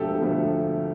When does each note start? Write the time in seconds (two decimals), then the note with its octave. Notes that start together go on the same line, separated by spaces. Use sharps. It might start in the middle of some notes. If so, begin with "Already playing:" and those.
Already playing: E1 D2 D3 F3 A3 G4 A4
0.21 E1 D2 D3 F3 A3